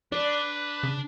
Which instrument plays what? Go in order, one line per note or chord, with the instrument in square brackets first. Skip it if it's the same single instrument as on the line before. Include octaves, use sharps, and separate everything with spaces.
[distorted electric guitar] D4 [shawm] B4 [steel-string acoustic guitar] D5
[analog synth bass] C#3